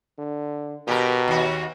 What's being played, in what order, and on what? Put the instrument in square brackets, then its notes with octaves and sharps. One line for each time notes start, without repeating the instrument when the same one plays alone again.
[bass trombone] D3
[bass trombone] B2 [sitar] G4 A#4
[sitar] D#2 F#4